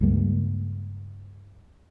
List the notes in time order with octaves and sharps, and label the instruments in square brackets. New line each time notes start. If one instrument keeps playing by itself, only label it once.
[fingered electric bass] C#2 G2 G3 A#3